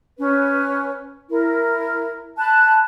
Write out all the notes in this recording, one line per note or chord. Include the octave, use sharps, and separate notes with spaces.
C#4 B4
E4 A#4
A5 B5 F#6